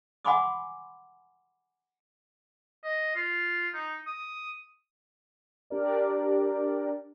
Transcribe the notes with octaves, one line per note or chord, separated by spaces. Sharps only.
F#5 G#5 B5 C6 D6 D#6
D#5
F4
D#4
D#6
D4 G4 A#4 D5